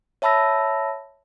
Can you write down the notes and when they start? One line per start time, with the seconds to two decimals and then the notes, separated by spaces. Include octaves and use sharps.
0.22 C#5 E5 A5 B5 E6 A#6